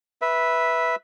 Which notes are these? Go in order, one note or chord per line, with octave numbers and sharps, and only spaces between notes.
B4 E5